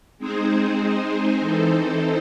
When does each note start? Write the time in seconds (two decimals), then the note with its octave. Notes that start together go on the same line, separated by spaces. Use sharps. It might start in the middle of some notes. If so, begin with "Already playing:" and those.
0.18 G#3 C4 D#4 G#4 C5
1.40 E3 C4 D#4 A4 C5